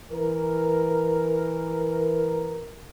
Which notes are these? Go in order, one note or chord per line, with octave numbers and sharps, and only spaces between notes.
E3 A#4